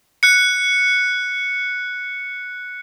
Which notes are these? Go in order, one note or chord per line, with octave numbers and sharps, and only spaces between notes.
F#6 C#7